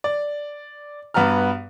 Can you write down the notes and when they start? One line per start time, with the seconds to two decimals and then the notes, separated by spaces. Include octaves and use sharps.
0.04 D5
1.14 G2 B3 F#4 A#5 F6